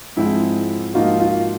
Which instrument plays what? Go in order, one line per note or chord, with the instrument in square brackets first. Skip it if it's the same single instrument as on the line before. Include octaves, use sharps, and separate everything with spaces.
[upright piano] G#2 F3 G#3 C4 [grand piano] E4
[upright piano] G#2 F3 A#3 D#4 F#4 [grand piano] F4
[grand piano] F4